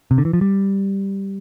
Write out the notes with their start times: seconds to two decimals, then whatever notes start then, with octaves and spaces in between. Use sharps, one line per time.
0.11 C3
0.18 D3
0.25 E3
0.33 F3
0.41 G3